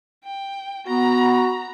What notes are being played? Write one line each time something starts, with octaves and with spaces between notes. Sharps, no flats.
G5
B3 F#4 A#5 B5